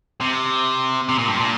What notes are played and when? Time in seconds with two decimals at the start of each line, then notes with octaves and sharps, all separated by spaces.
0.21 C3
1.09 C3
1.18 A#2
1.28 G2
1.37 A#2